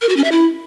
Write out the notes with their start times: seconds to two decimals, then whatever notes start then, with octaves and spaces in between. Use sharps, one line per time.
0.02 A#4
0.09 F#4
0.17 C#4
0.24 E5
0.32 E4